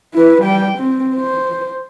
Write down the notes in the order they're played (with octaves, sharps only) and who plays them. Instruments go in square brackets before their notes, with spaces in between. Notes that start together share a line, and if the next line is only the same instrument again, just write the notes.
[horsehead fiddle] E4 B4
G3 G5
C4
C5